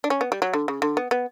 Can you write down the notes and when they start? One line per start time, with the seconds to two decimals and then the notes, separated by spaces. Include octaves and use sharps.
0.04 D4
0.10 C#4
0.21 B3
0.32 G3
0.42 F#3
0.54 D3
0.68 C#3
0.82 D3
0.97 B3
1.11 B3